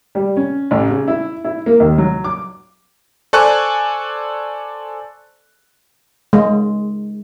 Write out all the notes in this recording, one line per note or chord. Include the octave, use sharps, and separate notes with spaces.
G3
C#4
A1
C#3
E4
E4
A#3
D#2
F#3
D6
A4 C5 D5 G#5 C#6 F#6
G#3